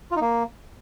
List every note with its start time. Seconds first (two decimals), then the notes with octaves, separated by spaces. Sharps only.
0.11 F4
0.16 D#4
0.21 A#3